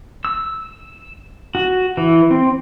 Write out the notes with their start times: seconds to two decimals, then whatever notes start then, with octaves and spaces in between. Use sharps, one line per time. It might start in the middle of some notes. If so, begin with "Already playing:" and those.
0.25 E6
1.55 F#4
1.97 E3
2.30 C4